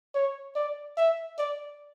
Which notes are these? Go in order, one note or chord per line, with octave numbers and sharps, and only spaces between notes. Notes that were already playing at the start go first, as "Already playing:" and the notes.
C#5
D5
E5
D5